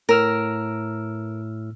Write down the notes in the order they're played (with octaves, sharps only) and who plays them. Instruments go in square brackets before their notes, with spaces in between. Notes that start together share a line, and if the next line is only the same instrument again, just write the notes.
[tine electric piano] A2 E6 F6 [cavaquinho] A#4